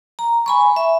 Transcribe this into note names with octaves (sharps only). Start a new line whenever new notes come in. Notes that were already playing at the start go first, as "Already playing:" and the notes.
A#5
G#5 B5 C#6
E5